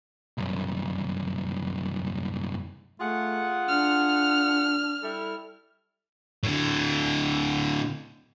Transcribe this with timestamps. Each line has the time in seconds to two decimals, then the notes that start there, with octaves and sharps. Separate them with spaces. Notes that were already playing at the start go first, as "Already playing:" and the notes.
0.38 C2 F#2
3.00 A3 F4 G#4 F#5
3.68 D4 F6
5.03 G3 E4 A4
6.43 A2 D3